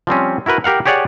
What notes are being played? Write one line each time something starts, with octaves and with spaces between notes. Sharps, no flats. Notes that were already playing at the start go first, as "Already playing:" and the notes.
F3 G3 C4 C#4
E4 F#4 A#4 B4
G4 A#4 F5 F#5
G4 G#4 C#5 D5 F#5